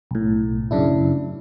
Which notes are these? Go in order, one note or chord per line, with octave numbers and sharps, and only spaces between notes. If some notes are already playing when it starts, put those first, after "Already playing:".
B1 A2
F#2 C#3 D4 E4